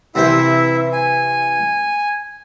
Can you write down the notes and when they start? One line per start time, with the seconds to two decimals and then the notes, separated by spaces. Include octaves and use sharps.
0.15 C3 E3 E4 C5 E5
0.93 G#5